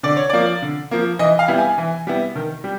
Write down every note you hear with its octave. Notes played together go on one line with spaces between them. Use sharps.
D3 D5
C#5
F3 A#3 D5
D3
F3 A#3
E3 D#5
F5
G3 B3 E4
G#5
E3
G3 B3 E4
D#3
G3